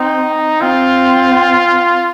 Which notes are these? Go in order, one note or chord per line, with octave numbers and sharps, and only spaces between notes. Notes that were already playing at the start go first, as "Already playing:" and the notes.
Already playing: C4 D#4
C4 F4